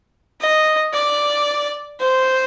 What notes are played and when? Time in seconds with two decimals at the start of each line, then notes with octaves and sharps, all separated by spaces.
0.41 D#5
0.93 D5
2.01 C5